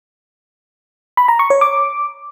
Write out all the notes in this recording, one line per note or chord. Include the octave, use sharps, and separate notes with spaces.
B5
A#5
C#6
C#5
D6